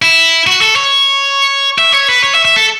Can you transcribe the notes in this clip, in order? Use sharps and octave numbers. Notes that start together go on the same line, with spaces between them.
E4
F#4
A4
C#5
E5
C#5
B4
C#5
E5
E5
A4